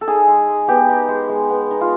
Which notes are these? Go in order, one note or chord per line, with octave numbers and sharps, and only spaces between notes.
A4
D#4 G#4
G#3
G#3
B3 G4
D#4
G#3
G#3
B3
D#4
F4